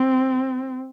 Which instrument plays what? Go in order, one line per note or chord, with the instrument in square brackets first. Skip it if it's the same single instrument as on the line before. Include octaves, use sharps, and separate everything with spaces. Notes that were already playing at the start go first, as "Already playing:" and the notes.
Already playing: [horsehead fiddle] C4